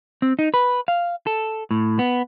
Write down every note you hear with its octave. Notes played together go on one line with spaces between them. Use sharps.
C4
D#4
B4
F5
A4
A2
B3